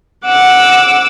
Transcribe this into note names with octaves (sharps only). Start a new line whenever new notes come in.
F#5 D6 E6